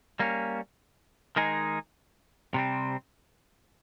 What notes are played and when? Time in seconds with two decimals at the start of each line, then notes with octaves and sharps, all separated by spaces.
0.19 G3 A#3 C#4
1.36 D#3 G#3 D#4 G#4
2.54 C3 G3 C4